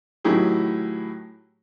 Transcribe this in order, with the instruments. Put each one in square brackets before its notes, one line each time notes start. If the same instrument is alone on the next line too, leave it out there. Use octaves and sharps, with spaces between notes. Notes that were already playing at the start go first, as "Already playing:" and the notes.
[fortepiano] A2 D#3 F#3 E4 G4 G#4